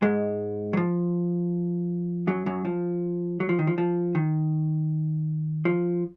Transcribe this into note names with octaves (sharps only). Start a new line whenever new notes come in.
G#2 G#3
F#3
F3
F#2 F#3
F#2 F#3
F3
F#3
F3
D#3
F3
F3
D#3
F3